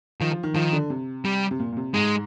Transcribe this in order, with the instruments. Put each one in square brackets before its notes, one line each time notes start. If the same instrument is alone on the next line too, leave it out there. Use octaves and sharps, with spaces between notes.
[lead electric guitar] D#3 [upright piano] F3
[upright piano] F3
D#3
[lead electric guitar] D#3 [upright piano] F3
[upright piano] D3
C3
[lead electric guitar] G3
[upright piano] C3
A#2
A#2
C3
[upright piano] G#2 [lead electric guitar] G#3